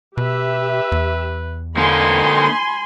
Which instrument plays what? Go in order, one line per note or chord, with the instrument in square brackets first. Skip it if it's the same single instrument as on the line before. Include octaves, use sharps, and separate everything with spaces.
[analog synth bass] B2 [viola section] G4 E5 [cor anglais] B4
[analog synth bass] E2
[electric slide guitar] D3 A#3 [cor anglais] D#4 [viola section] G#5 B5 C6